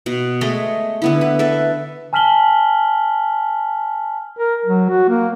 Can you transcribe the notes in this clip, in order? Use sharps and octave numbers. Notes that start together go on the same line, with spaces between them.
B2
G#3 A3 C#5 D#5
D3 B3 E4
B4
A4 B4 E5
G#5 A5 F6 B6 F#7 G7
A#4
F#3
F#4
A#3